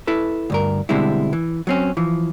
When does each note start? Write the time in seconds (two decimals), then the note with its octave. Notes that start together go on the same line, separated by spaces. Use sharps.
0.07 E4 A4 B4
0.50 D2 G2 A#4
0.89 B2 D3 G3 G#3 C4 E4
1.33 E3
1.67 F#3 C4 C#4
1.97 E3 F3